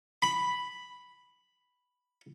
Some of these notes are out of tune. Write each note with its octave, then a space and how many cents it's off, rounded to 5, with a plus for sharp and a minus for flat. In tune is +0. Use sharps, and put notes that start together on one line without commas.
B5 +0